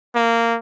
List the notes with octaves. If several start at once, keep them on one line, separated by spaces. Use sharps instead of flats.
A#3